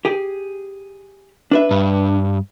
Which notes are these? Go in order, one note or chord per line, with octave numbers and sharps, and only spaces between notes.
G4 G#4
D4 B4 E5
G2